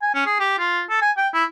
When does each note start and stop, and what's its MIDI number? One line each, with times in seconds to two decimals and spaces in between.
0.02 0.10 80
0.14 0.26 61
0.26 0.39 68
0.40 0.56 67
0.59 0.82 65
0.90 0.98 69
1.02 1.12 80
1.17 1.29 79
1.34 1.45 64